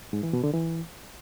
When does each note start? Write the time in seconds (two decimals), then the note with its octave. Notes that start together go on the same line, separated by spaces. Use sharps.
0.13 G#2
0.23 E3
0.33 B2
0.44 D3
0.54 E3